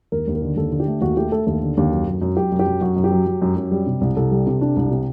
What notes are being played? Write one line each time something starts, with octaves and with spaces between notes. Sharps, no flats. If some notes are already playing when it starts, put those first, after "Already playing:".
D#2 A#4
D#2
A#4
D3
D#2 A4
D3
G4
A3
D#2 F#4
A3 G4
A3 A4
D#2 A4
D3
D#2
F#2
F#2
F#2
F#2 G4
F#2
G4
F#2
F#2 F#4
F#2
G4
F#3
F#3
F#2
F#2
G3
C3
C2
C2 A4
G3
C3
D4
C2
C3